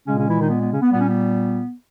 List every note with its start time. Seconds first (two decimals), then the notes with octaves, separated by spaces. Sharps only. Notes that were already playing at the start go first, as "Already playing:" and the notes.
0.07 A#2 C#3 G#3 C#4
0.18 C#3 C#4
0.28 E3 E4
0.40 D#3 D#4
0.50 B3
0.61 B3
0.71 C#3 C#4
0.82 B3
0.92 A#2 G3 B3
1.00 C#4
1.08 B3